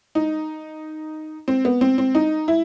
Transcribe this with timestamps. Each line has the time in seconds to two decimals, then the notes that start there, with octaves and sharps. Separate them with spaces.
0.15 D#4
1.48 C4
1.65 B3
1.81 C4
1.98 C4
2.15 D#4
2.48 E4